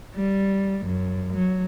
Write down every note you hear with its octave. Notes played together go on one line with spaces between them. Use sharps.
G3
F#2
F#3